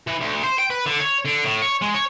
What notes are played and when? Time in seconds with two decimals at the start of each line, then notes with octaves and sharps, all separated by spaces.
0.07 E3
0.21 D2
0.44 C5
0.59 G5
0.70 B4
0.86 D3
1.00 C#5
1.25 D3
1.44 A2
1.62 C#5
1.82 G#3
1.95 C#5